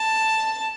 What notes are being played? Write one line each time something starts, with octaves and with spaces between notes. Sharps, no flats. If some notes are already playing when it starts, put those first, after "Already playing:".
Already playing: A5